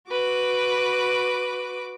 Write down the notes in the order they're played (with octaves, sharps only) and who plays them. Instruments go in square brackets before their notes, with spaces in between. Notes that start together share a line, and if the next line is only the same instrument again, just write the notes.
[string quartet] F#4 B4 D6